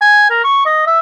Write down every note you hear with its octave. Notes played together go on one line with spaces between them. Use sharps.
G#5
A#4
C#6
D#5
E5